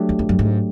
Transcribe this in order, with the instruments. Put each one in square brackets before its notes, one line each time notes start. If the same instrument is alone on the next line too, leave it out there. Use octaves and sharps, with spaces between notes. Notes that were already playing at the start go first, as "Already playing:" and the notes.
Already playing: [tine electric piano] F#3 A3 D4 G4
[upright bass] E2
F2
F#2
G#2